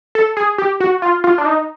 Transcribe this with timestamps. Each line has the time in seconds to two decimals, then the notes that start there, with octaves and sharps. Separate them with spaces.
0.15 A4
0.37 G#4
0.58 G4
0.80 F#4
1.02 F4
1.24 F4
1.38 D4
1.46 D#4